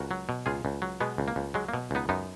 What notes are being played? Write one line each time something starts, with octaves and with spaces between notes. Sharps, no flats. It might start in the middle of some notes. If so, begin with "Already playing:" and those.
Already playing: C#2 F#4 A#4
F#3
B2
C#2 F4 G#4
C#2
F#3
B2 G#3 B3
C#2
A#3
C#2
F#3 G#3
A#3
B2
C#2 B3 D#4
F#2 B3 D#4